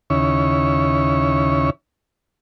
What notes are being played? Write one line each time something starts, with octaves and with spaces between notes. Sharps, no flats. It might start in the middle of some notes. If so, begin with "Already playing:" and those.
D#2 C#3 C#4 E4 C#5